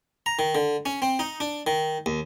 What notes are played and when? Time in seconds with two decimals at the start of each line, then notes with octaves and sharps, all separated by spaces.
0.26 A#5
0.39 D#3
0.55 D3
0.86 C#4
1.02 C4
1.19 D#4
1.40 D4
1.67 D#3
2.06 D#2